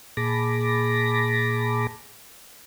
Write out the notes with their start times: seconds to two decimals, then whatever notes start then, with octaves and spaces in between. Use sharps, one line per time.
0.17 A#2 G#4 A5 B5 D6 A#6